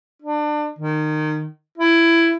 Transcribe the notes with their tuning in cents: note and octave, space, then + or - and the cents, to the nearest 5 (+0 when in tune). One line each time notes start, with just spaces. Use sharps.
D4 +30
D#3 -20
E4 +15